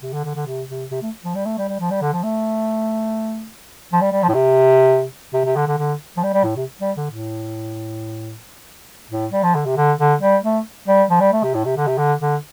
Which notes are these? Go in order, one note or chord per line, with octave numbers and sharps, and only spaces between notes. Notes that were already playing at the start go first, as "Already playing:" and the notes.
C3
D3
D3
D3
C3
C3
C3
A3
F3
G3
A3
G3
G3
F3
G3
D3
F3
A3
F3
G3
G3
F3
A2
C3
C3
C3
D3
D3
D3
F3
G3
G3
A2
C3
G3
D3
A2
A2
G3
F3
D3
C3
D3
D3
G3
A3
G3
F3
G3
A3
C3
A2
C3
D3
C3
D3
D3